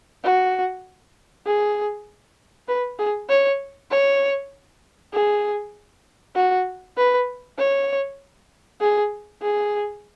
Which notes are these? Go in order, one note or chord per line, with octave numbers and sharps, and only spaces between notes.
F#4
G#4
B4
G#4
C#5
C#5
G#4
F#4
B4
C#5
G#4
G#4